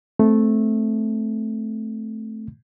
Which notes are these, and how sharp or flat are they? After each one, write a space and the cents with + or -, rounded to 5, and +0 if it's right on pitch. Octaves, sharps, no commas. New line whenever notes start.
A3 -10 C4 +0